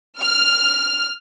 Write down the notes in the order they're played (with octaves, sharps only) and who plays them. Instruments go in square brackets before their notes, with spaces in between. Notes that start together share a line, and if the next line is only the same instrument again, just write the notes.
[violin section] F6